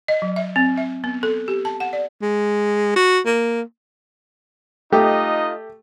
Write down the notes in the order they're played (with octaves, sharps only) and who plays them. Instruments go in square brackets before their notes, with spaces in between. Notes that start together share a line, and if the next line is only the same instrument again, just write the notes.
[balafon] D#5
F#3
E5
C4
E5
B3
A4
G4
A5
F#5
D5
[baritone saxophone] G#3
F#4
A#3
[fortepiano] A3 G4 [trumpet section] D#4 F4 D#5